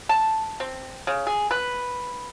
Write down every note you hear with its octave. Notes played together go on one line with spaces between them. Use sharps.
A5
C4
C#3
G#4
B4